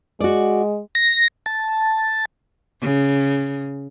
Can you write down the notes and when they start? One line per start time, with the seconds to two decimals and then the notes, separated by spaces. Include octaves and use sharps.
0.20 G#3 F#4 D5
0.95 A#6
1.46 A5
2.81 C#3